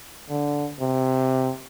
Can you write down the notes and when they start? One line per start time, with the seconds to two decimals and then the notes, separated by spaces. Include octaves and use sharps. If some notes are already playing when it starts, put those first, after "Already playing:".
0.30 D3
0.80 C3